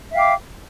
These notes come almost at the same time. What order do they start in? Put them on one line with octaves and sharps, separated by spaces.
E5 F5 G5 D6